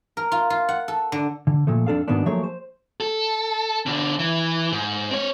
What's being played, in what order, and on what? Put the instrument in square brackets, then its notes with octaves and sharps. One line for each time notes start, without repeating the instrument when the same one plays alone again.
[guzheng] A#4
F4
F4
F#5
A4
D3
[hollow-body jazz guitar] D3
A#2 F3 A3
F2 D4 A4 F5
G#2 B2 D#3 B3 D4
F3 F#3 A3 A#3 G#4 C#5
C5
[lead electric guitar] A4
B2 D3
E3
G#2
C4 C#5